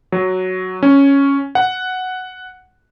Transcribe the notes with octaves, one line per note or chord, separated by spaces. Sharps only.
F#3
C#4
F#5